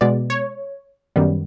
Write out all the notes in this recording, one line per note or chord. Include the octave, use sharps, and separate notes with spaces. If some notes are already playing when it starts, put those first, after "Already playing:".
B2 G#3 B3 D5
C#5
F#2 D#3 G3 B3